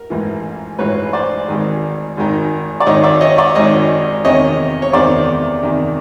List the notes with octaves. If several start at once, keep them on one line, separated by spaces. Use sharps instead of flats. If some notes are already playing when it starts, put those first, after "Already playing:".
Already playing: A#4
A1 G#2 E3
A1 G#2 E3 B4 C#5
C5 D5
G#1 G#2 D#3
G#1 G#2 D#3
D5
G#1 G#2 D#3 C#5 D#5
D5 E5
C#5 D#5
D5 E5
G#1 G#2 D#3 C#5 D#5
E2 C3 D#3 C#5 D#5
C#5
E2 C3 D#3 C5 D5
E2 C3 D#3